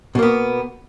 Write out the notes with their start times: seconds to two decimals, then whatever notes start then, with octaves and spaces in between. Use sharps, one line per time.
0.15 B2
0.19 A#3
0.22 B3